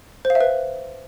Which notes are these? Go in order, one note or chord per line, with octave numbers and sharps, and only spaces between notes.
C5
F5
E5
B4